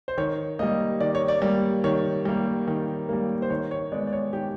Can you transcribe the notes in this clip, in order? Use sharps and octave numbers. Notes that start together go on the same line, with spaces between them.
C5
D#3 C#5
G3 A#3 D#5
D#3 D5
C#5
D5
G3 A#3
D#3 C#5
G3 A#3
D#3
G3 A#3
C5
D#3 C#5
C#5
G#3 B3 D5
D5
C#5
D#3 G4